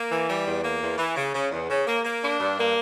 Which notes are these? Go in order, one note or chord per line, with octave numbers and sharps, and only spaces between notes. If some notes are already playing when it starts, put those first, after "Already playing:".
Already playing: A#3
E3
G3
E2
A#3
E2
E3
C#3
C#3
E2
C#3
A#3
A#3
D4
G2
A#3